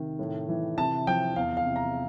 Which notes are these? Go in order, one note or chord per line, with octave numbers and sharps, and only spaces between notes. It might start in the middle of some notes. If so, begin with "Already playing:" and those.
Already playing: C3 D#3
A2
E3
C3 A5
F3 G5
E2 F5
F5
C3
A#5